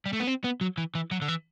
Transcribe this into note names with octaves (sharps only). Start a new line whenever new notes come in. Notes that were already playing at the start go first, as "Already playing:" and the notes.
G3
A3
B3
C4
B3
F#3
E3
E3
F#3
D3
E3